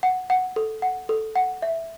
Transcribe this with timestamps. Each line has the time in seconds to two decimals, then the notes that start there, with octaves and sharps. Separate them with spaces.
0.03 F#5
0.30 F#5
0.56 A4
0.82 F#5
1.09 A4
1.36 F#5
1.62 E5